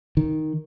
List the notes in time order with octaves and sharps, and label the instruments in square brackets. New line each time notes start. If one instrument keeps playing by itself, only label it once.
[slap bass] D#3